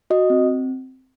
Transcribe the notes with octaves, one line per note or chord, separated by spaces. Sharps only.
F#4 D#5
C4